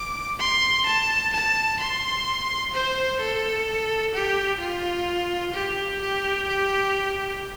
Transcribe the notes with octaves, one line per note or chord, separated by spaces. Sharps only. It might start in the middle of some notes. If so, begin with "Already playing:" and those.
Already playing: D6
C6
A5
A5
C6
C5
A4
G4
F4
G4
G4
G4